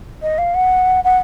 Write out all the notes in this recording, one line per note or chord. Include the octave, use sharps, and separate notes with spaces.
D#5
F5
F#5
F#5